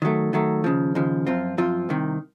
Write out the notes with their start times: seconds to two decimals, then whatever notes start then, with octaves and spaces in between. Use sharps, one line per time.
0.02 D#3 F#3 A3
0.33 D#3 F#3 A3
0.64 D#2 C#3 F3
0.95 D#2 C#3 F3
1.27 F#2 F3 C4 F4
1.58 F#2 F3 C4 F4
1.89 C2 C3 D#3